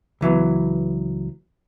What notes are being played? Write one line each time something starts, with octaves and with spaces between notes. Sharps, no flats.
C#2 E3 F#3 B3